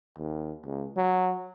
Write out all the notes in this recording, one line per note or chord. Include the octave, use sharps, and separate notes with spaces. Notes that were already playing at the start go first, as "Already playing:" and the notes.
D#2
C#2
F#3